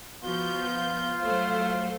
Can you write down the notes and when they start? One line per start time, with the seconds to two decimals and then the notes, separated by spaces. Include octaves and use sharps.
0.24 F3 B3 F4 F#4 G6
0.75 F5
1.22 F#3 A3 C5